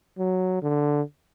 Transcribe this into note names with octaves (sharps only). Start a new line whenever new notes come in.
F#3
D3